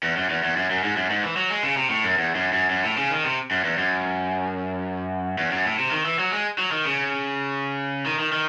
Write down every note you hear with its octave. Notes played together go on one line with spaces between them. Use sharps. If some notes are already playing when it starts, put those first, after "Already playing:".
E2
F#2
E2
E2
F#2
F#2
G#2
F#2
G#2
E3
F#3
G#3
C#3
C3
A2
F#2
E2
F#2
F#2
F#2
A2
C#3
D#3
C3
F#2
E2
F#2
E2
F#2
A2
C3
D#3
E3
F#3
G#3
F#3
D#3
C#3
D#3
D#3
D#3